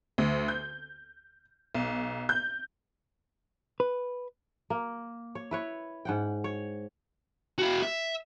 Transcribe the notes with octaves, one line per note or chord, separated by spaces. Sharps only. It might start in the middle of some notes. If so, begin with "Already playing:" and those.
D2
G6
B1
G6
B4
A#3
C#5
E4 B4 C#5
G#2 F#5 G5
C#5
E4 F#4
E5